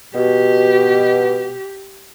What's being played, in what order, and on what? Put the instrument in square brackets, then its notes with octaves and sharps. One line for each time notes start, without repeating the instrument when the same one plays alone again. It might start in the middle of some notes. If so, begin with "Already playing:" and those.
[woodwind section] B2 [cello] G4